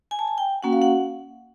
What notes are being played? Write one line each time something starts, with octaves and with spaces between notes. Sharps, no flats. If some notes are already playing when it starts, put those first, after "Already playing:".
G#5
A5
G#5
G5
A#3 C#4 F#4 F#5
F5
F#5